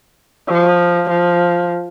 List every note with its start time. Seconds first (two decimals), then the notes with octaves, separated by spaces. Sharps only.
0.49 F3
1.10 F3